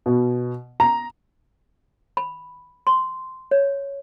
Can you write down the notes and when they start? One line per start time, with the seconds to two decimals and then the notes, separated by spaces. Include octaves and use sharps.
0.06 B2
0.80 A#5
2.17 B5
2.87 C6
3.51 C#5